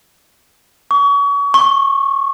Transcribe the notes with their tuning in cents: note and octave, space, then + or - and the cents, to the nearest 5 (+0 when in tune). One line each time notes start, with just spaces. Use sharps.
C#6 +35
C#6 -25